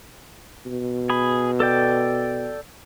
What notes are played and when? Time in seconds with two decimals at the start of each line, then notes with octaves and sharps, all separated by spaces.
0.66 B2
1.10 G#4 B5
1.60 A4 D5 G5